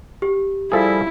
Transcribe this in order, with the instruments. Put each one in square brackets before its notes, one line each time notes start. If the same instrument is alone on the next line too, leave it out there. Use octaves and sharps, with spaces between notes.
[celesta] G4
[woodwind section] F3 G3 [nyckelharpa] E4 [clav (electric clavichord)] G#4 A4 E5